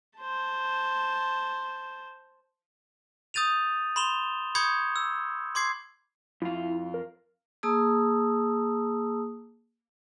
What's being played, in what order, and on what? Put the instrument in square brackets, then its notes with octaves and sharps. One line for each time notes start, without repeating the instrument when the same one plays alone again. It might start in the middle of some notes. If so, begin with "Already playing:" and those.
[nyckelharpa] C5 A5
[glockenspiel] D#6 G6 A6 D#7 F7
B5 C6 E7 F7 G7
B5 C#6 D#6 G6 G#6 C#7
E6
C6 D6 G#6 C7
[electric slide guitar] F2 F4 [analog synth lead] E4
[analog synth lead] A#4
[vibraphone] A#3 G#4 A5 A#5 D#6 E6